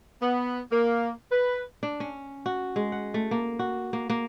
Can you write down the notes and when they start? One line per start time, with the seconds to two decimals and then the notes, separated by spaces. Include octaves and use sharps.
0.21 B3
0.71 A#3
1.32 B4
1.83 D4
2.00 C#4
2.46 F#4
2.76 G#3
2.92 F#5
3.14 A3
3.31 A#3
3.59 F#4
3.93 A#3
4.10 A#3